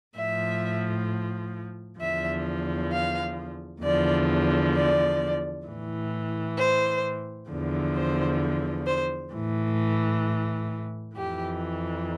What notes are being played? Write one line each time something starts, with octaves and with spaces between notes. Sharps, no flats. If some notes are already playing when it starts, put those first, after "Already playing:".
A2 F3 E5
E2 D3 F3 E5
F5
E2 D3 F3 D5
D5
A2 E3
C5
E2 D3 F3
C5
C5
A2 E3
F2 E3 G4